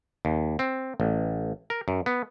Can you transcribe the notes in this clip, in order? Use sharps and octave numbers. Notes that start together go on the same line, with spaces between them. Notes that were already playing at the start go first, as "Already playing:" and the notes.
D#2
C4
A1
A#4
F#2
B3